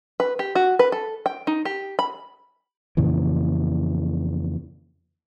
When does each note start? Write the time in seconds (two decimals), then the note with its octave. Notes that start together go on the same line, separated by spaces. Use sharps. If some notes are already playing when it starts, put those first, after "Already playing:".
0.20 B4
0.39 G4
0.55 F#4
0.79 B4
0.92 A4
1.26 G5
1.47 D#4
1.65 G4
1.99 B5
2.97 F2 A#2 C#3 E3